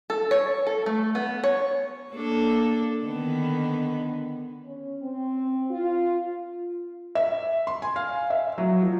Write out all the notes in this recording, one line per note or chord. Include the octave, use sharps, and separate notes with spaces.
A4
C#5
A4
A3
B3
C#5
A#3 D4 A4
D3 D#3 B3
C#4
C4
F4
E5
C6
G#5
F5
E5
F#3
F3